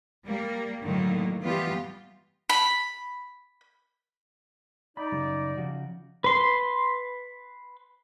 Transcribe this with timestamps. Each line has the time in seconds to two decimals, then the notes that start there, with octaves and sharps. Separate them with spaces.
0.25 G3 A#3
0.84 A2 D3 D#3 F#3 A#3
1.41 E3 G3 B3 F4 G4
2.50 B5
4.97 D#4 D5 B5
5.12 F#2 C#3 G3
5.57 C#3 F3 F#4
6.24 B4 C6